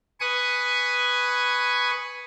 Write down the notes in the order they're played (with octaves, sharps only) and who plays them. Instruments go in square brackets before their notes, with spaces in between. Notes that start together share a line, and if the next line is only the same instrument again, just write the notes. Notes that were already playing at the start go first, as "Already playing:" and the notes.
[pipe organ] B4 G#5 C#6 D#6